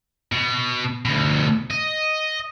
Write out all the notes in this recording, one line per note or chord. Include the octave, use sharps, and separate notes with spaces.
B2
D2 B2
D#5